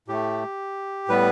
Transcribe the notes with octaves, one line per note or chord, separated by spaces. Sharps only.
A2 A3 G4
A2 G3 B3 B4